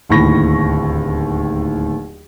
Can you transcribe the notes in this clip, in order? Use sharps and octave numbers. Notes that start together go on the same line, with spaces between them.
D1 D#2 A2 B5 C#6 A#6